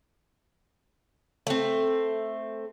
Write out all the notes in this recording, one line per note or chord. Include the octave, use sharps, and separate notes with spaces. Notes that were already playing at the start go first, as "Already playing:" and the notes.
A3 C4